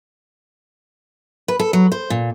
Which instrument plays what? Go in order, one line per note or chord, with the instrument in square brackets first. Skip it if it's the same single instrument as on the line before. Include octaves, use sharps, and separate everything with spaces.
[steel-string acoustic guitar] B4
A4
F#3
C5
A#2